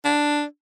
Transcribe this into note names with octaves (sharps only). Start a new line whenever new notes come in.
D4